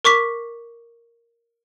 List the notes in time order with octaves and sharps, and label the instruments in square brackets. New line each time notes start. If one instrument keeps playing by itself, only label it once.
[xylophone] A#4 C#6 D6 B6